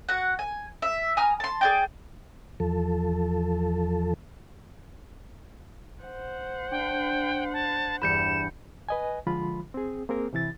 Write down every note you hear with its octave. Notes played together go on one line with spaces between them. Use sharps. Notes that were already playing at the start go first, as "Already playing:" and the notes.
F#4 F#5
G#5
E5
G#5 A#5 D#6 F6
A5 C6
G#4 D5 G5
E2 F3 A4
C5 F#5
D4 G5
A5
E2 G2 G3 B5 G6 C#7 E7
B4 D#5 G#5
D3 F3 G#3 F4 B5
C4 G#4
A#3 C4 G#4 A#4
C3 E3 E4 A6